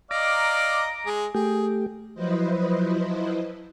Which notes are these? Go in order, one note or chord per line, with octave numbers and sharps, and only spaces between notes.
D5 D#5 F5 A#5 D6
G#3 G#4
A3 G4 G#4
F3 F#3 E4 B4 C5 D#5